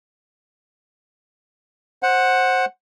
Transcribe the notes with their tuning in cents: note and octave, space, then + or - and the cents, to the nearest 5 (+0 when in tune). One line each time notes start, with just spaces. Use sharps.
C5 +15 F#5 +0